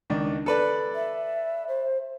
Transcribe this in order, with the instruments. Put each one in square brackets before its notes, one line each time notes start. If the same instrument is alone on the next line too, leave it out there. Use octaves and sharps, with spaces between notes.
[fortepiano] C#2 D#3 D4
A4 B4 D5
[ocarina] E5
C5